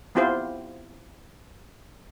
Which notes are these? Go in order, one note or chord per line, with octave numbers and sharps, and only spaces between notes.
B3 C4 E4 F4 G4 C5